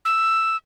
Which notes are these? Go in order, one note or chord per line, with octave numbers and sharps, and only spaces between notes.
E6